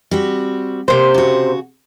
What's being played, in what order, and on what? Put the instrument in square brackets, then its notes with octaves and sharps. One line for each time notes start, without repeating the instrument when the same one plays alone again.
[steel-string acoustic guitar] G3 C4 F#4
[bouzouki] C3 C5 [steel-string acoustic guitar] A#3
[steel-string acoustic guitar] C#3 F#4